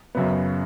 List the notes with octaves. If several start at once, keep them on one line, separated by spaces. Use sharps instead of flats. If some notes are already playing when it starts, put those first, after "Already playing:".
F#2 C#3 F#3 B3